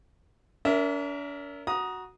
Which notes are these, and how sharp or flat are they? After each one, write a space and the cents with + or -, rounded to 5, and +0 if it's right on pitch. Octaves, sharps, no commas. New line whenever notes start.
D4 -45 A#4 +0 E5 +0
F#4 +0 A#5 +25 D#6 +0